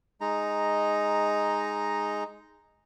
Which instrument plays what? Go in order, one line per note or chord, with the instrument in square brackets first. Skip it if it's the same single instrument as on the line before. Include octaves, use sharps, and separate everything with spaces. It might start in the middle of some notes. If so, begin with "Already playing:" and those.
[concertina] G#3 D#4 A#5